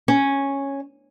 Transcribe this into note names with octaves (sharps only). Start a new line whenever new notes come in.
C#4